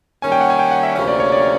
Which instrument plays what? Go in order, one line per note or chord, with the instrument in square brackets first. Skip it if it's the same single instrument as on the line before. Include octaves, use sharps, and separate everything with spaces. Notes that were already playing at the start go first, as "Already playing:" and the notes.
[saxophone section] D#3 G3 A#3 C#4 [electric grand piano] G#5
[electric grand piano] G5
F#5
G#5
G5
F#5
E5
[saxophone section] D2 C3 F3 A#3 C#4
[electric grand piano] D5
C#5
D5